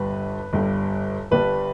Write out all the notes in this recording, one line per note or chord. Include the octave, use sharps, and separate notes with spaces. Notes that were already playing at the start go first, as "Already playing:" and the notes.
Already playing: G1 G2 G3 B4
G1 G2 G3
G1 G2 G3 B4